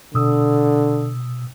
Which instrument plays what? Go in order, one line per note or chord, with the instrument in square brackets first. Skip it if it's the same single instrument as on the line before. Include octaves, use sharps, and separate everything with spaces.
[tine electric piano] B2 D#6 E6 [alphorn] D3